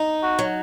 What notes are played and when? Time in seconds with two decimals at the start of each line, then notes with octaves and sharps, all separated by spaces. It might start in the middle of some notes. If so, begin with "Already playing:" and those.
Already playing: D#4
0.23 F#4
0.39 F#3